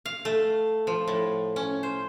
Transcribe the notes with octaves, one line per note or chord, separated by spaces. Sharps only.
F5
A3
F3
A2
C#4
C5